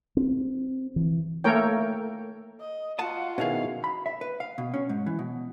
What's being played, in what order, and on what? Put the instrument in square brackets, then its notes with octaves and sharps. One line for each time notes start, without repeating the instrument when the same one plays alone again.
[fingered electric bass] C4
E3
[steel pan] A3 A#3 A4 A#4 C#5 G5
[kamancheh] D#5
[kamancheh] F4 F#4 [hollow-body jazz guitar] D#5 A5 [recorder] F#5
[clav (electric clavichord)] B2 D#3 [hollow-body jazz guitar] C#4 E4 G#4 [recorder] F5
[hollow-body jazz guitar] B5
E5
B4
F5
B2
C#4
G#2
E3
B2